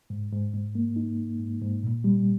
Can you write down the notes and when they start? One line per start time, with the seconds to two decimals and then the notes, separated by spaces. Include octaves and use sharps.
0.10 G#2
0.32 G#2
0.54 G#2
0.75 A#3
0.96 D#4
1.18 G#2
1.39 G#2
1.62 G#2
1.83 A#2
2.04 G3